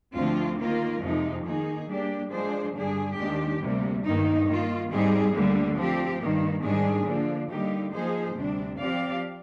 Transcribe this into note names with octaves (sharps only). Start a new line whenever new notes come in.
D2 D3 F3 C4 F4
D#3 A#3 F4 A#4
F2 C3 F3 G#3 D#4
D#3 A#3 D#4 G#4
G3 A#3 D4 G4
F3 G#3 D4 G#4 C5
G2 D3 G3 D4 G#4
D#2 D#3 G#3 D4 G4
D2 C3 G3 A#3
G2 D#3 A#3 D#4
D#3 A#3 F4
G#2 G3 C4 D#4 G#4
D2 D3 G3 A#3
F3 C4 G4
G2 D#3 A#3
G#2 D#3 G3 D4 G#4
D3 F3 A#3 D4
D3 G3 A#3 D#4 G4
F3 A#3 D#4 G#4 C5
D2 C3 G3 D4
F3 C4 G4 D5 F5